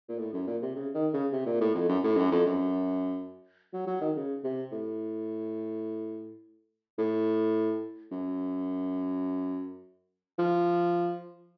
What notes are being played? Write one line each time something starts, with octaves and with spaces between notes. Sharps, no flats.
A#2
A2
F#2
A#2
C3
C#3
D#3
C#3
C3
A#2
A2
F2
F#2
A2
F#2
F2
F#2
F#3
F#3
D#3
C#3
C3
A2
A2
F#2
F3